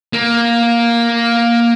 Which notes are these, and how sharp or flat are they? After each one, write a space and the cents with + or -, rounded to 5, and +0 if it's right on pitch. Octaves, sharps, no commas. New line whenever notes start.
A#3 +5